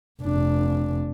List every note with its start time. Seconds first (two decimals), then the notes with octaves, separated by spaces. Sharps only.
0.22 F1 D4